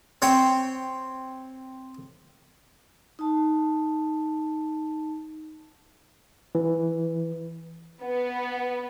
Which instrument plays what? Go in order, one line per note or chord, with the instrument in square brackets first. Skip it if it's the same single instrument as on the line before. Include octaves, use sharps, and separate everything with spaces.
[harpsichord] C4 C#5 G5
[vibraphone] D#4 A5
[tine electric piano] E3
[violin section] B3